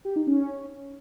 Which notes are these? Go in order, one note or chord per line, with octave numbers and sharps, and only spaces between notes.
G4
D#4
C#4